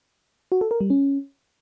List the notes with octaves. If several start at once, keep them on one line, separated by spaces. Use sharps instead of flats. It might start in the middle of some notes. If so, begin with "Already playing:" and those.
F#4
A4
A#4
G3
C#4